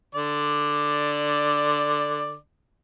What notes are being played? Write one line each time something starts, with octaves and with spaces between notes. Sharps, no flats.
D3 D5